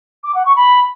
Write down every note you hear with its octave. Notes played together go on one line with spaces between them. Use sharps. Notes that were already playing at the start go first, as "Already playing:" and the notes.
D6
F#5
C#6
B5